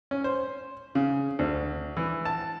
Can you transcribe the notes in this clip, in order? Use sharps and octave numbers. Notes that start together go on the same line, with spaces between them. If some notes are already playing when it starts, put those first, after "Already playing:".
C#4
C5
C#3
D2
E3
A5